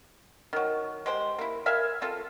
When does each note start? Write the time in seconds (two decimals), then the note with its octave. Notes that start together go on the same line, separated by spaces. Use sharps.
0.53 D#3 F#3
1.06 G#3 G4 C5
1.39 A#3 E4
1.66 A#4 E5 F5 G#5
2.02 C4 F4 A4